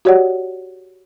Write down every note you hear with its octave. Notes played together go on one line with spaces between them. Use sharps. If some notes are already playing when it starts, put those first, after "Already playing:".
F#4 G4 C#5 D5 F#5